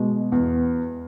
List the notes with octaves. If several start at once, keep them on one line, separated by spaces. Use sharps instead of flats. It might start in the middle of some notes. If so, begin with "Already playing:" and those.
Already playing: B2 G#3
E2